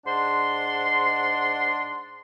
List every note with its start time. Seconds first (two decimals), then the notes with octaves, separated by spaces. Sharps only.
0.05 G#2 D4 F#5 C6